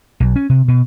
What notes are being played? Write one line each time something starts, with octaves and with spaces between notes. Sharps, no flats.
B1
C#4
C3
B2